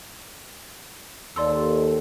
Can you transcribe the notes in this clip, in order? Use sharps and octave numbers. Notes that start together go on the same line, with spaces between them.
D#2 A4 D5 C6 E6